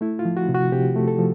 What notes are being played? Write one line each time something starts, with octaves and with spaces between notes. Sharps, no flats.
A3 E4
F4
F3
F#4
C3
F#4
C3 G4
A3
A4
F3